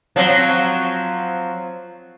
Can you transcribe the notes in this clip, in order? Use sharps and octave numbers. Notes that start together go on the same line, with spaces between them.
F3 F#3 C4